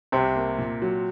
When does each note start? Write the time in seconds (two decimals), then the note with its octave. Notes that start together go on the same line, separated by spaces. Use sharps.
0.12 C2 C3
0.36 A#3
0.58 A#2
0.82 F#3